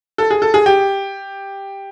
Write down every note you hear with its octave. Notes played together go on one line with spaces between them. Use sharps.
A4
G#4
A4
G#4
G4